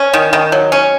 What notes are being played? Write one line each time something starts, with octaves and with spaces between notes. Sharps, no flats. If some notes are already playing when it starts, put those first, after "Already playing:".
Already playing: C#4
D#3
D#3
F#3
C#4